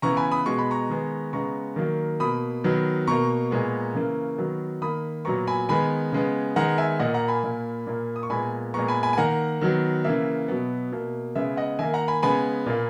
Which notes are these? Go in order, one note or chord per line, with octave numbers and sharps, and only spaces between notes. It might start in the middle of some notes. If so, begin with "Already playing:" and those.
C#3 E3 B3 A#5 C#6
G#5 B5
B5 D#6
B2 G#3 B3 C#6
B5
A#5 C#6
D#3 G#3 B3
C#3 G#3 B3 A#5 C#6
D#3 F#3 A#3
B2 A#3 B5 D#6
D#3 F#3 B3
B2 A#3 A#5 C#6
A#2 G#3 B3
C#3 E3 A#3
D#3 F#3 B3
D#3 A#3 B5 D#6
A#2 F#3 B3 A#5 C#6
G#5 B5
D#3 G#3 B3 G#5 B5
C#3 G#3 B3
D#3 G#3 B3 F#5 A#5
E5 G#5
A#2 A#3 D#5 F#5
F#5 A#5
G#5 B5
A#2 A#3
A#2 A#3
D#6
C#6
A#2 G#3 B3 G#5 B5
A#2 G#3 B3 A#5 C#6
G#5 B5
G#5 B5
G#5
D#3 A#3 F#5 A#5
D#3 F#3 B3
C#3 E3 A#3 E5
B2 F#3 B3
B2 A#3
C#3 G#3 B3 E5
D#5 F#5
D#3 A#3 E5 G#5
F#5 A#5
G#5 B5
C#3 G#3 B3 G#5 B5
A#2 A#3